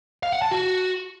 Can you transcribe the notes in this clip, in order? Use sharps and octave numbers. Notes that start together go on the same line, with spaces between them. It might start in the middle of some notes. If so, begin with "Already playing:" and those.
F5
F#5
A5
F#4